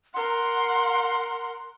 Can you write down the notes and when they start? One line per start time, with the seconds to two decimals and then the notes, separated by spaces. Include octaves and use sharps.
0.14 A#4 F#5 C6